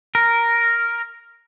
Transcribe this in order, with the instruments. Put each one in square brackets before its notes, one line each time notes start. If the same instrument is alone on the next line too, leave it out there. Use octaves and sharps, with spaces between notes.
[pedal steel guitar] A#4